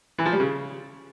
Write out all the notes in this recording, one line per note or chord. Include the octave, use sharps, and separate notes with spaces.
E3
F3
G3
C#3